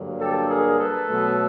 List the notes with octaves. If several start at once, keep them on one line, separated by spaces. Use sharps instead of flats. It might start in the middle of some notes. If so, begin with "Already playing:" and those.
Already playing: G2 D3 F#3 A#3
G4 A4
G#4 A#4
A4 B4
B2 F#3 A3